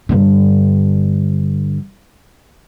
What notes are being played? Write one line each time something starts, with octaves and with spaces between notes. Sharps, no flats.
G2 D3